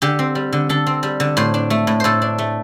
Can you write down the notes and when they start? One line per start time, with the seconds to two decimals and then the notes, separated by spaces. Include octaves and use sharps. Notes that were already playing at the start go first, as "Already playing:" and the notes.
0.02 D3 G4
0.19 C4
0.35 G3
0.53 D3
0.69 D3 A4
0.87 C4
1.03 G3
1.20 D3
1.37 A2 C5
1.54 D4
1.70 A3
1.87 A2
2.00 A2 A4 C5
2.22 D4
2.38 A3